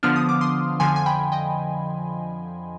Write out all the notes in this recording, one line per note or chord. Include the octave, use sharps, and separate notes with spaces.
D3 F3 B3 D4 F6
D#6
D6
C6 D#6
F2 D3 F3 G#5 C6
G#5
G5 B5
D#5 G5